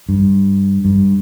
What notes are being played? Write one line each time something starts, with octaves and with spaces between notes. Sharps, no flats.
G2
G2